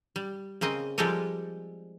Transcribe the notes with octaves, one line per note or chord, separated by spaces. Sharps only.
G3
C#3 A#3 C4 D#5
F3 G3 G#3 G4 A4 A#4